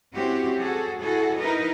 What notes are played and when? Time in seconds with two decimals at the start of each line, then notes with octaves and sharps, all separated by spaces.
0.14 C4 C#4 E4 F#4 G4
0.58 F#4 G#4 A4
1.00 E4 F#4 G#4 A4
1.39 D#4 E4 A#4 B4 D#5